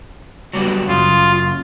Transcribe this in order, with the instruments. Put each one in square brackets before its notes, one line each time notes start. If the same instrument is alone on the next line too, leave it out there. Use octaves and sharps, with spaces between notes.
[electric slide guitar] F#3 G3 B3
[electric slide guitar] F#2 C#3 [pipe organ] F4